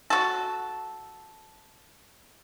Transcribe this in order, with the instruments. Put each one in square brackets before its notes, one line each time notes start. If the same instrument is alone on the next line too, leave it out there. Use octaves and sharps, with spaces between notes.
[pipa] F#4 A4